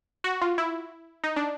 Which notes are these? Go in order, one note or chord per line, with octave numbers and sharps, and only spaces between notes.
F#4
F4
E4
D#4
D4